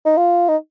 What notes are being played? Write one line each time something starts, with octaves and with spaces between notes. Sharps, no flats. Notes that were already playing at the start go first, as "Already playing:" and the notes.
D#4
F4
D#4